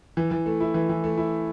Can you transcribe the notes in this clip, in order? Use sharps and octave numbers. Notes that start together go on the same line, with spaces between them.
E3
E3
A3
E4
E3
E3
A3
E4